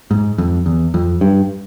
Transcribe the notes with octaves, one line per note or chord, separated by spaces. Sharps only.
G#2
F2
E2
F2
G2